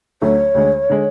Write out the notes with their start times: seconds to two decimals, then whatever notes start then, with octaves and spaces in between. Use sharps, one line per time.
0.22 D2 D3 F#3 A3 C#5
0.54 D2 D3 G#3
0.90 D3 G#3